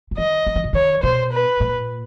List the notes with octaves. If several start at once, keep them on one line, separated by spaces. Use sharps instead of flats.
E3
D#3 D#5
E3
D#3
D3
D#3 C#5
B2 C5
B4
A#2